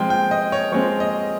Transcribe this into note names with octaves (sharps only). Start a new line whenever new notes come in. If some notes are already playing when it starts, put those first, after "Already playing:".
Already playing: F3 G#3 C4 G5 G#5
G5
D#5
C#5
F3 G#3 C4 C#5
D#5